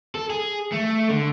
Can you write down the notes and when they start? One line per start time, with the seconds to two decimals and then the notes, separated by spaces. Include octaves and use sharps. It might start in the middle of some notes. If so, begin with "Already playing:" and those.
0.15 A4
0.30 G#4
0.72 A3
1.09 D3